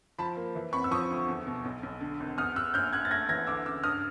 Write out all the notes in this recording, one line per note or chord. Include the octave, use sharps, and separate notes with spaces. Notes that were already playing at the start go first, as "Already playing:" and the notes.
F3 A5 B5
A#3
E3
F2 B5 C#6
E6
F3 C#6 D#6
D2
E2
B2
B1
B1
D3
G#1
E2 D#6 F6
E2 E6 F#6
A#1 F6 G6
A#1 F#6 G#6
A6
A3 G#6 A#6
E3 G#6 A#6
D2 D6 E6
C#3 D6 E6
G2 D#6 F6